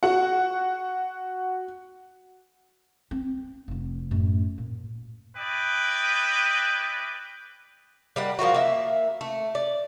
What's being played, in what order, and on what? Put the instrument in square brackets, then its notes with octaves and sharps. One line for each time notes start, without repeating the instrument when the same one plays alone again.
[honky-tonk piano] F#4 F#5
[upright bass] C4
F1 F3
F#2 A2
A#2
[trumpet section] E4 B4 D5 D#5 G5
[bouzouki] G3 A#3 F#5
F3 A#3 F4 F#4
A#3 E5
A3
D5